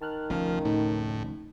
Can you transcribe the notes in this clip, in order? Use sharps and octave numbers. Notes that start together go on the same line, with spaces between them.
D#3 A5 F6 F#6
F1 D2 F3 C#4 A#4 F5 F6
A2 D#4